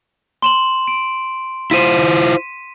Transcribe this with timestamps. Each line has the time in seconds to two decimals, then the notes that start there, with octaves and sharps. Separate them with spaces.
0.42 C6 E7 F#7
0.88 D7
1.71 E4 F4 C5 B6 D#7 E7